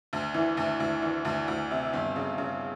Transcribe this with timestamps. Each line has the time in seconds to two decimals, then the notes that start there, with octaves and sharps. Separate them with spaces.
0.13 D2
0.34 E3
0.57 D2
0.80 D2
1.02 E3
1.25 D2
1.48 D2
1.71 C3
1.93 G1
2.16 C#3
2.38 C#3